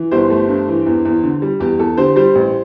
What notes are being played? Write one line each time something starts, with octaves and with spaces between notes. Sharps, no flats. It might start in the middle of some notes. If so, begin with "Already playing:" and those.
Already playing: E3
G1 G4 C5
A3
G2
E3
E2
E2
D3
G3
E2 G4
E2 A4
D3 G4 C5
G3 G4 C5
A1